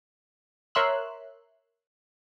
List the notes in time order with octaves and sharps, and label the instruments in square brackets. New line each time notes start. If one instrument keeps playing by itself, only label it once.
[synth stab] A#4 C#5 E5 C6 E6 F#6